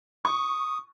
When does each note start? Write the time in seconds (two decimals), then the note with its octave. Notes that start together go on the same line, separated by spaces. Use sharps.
0.25 C#6 D#6